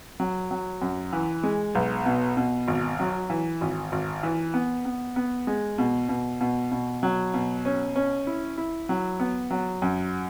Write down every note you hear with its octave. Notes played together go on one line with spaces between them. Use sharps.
F#3
F#3
F#2
E3
G#3
B1
B2
B2
G#1
F#3
E3
G#1
G#1
E3
B3
B3
B3
G#3
B2
B2
B2
B2
F#3
B2
C#4
C#4
E4
E4
F#3
B3
F#3
F#2